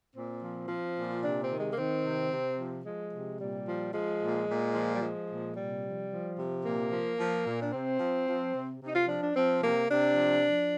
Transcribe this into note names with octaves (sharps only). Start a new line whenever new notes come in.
A#2 C4
F3
F3
A#2
C3 D4
C4
D#3
G#3
A#3
D#3 C4
C3
C3
F3
F3 G#3
C3
A#2 G3
F3
F3 G#3
A#2
A#2
F3
G3
F3 G#3
A#2
C3 G3
F3
F3
C3
A#2 A#3
F3
F3
A#2
D4
C3 C4
F3
F3
C3
C3
D#4
F4
F3 D4
D4
F3 C4
C3 A#3
C3 D4
F3
F3